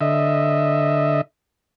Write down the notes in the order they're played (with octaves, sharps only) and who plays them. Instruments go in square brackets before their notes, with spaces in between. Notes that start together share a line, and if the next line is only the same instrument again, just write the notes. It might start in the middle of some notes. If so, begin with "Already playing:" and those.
[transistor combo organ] D3 D#5 E5